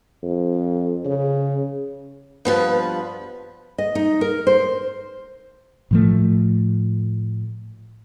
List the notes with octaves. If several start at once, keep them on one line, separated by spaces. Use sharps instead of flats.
F2
C#3
G2 F3 B3 B4
D#5
D#4
A#4
C5
A2 F3 A3